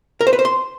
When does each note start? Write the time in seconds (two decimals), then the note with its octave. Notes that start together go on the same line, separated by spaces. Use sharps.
0.21 A#4
0.27 C5
0.33 B4
0.39 C5
0.45 C6